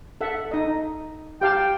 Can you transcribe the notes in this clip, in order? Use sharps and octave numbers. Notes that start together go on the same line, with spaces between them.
A4 E5 F#5
D#4 D#5
G4 F5 G5 A5